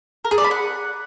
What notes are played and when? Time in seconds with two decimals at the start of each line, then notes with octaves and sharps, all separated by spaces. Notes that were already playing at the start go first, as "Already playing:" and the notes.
0.25 A#4
0.31 G#4
0.38 D5
0.44 B5
0.51 F#5